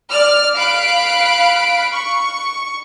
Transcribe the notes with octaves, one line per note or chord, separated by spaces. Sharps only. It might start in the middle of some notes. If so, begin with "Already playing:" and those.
D5 F6
F5 B5 F#6 D7
C#6